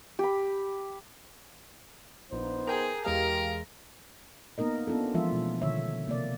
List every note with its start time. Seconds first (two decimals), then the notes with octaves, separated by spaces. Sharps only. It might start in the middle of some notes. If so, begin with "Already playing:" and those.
0.19 G4 B5
2.32 A#1 B3 D#4 C5
2.67 G#4 A#4 G5
3.05 E2 G#3 G4 A#4 F5
4.58 A#3 B3 D#4 A#4 D#5
4.87 B3 C#4 D4 F4 A4
5.14 E3 F3 G#3 F4 E5
5.30 B2 A3
5.62 B2 D3 D#3 C#5 E5
6.07 C3 A#3 D5